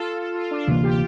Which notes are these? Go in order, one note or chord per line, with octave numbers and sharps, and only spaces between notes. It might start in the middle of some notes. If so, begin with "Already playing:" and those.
Already playing: F4 A4
A4
F4
D4
D2 C3 E3 A#3 F4
G4